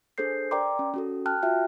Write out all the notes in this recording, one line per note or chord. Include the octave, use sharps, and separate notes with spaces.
D4 G#4 A4 C5 G6 C7
A#4 D5 G5 A#5 C6 D6
C#4
C#4 F#4 A4
G5 A5 F6 F#6
F4 F#4 E5 G5